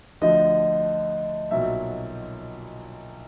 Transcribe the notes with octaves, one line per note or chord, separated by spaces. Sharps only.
D2 D3 F3 D#5
B1 A#2 F#3 E5